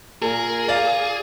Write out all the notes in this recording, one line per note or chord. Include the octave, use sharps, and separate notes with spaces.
A#2 G#4 A#4
F4 D5 F5